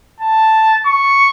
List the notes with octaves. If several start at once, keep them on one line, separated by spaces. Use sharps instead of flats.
A5
C#6